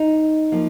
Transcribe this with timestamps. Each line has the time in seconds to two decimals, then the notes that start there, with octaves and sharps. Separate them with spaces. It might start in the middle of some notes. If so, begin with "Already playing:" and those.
Already playing: D#4
0.52 F3 A#3